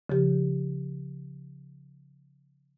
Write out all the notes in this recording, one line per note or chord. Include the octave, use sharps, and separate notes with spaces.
C#3 F3 G4